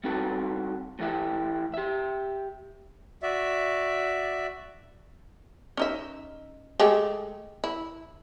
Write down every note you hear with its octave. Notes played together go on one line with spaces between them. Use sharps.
G3 C4 D#4 F#4 A4
A2 E3 A3 E4 G4 E5
G4 E5
F#4 D5 E5
C#4 D#4 E5
G#3 A3 G4
E4